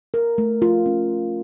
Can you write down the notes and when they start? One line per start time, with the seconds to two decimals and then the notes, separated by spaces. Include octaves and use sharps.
0.14 A#4
0.38 A3
0.62 F4
0.86 C#4